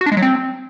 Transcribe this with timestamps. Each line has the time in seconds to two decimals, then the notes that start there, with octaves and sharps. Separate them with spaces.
0.01 F#4
0.06 D4
0.12 G#3
0.17 F#3
0.22 C4